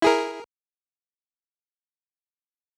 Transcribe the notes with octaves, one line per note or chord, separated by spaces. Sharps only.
E4 G#4 A#4